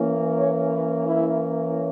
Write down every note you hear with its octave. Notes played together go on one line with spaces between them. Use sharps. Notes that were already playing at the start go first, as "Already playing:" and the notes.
Already playing: E3 A#3 C#4
C#5
B4
E4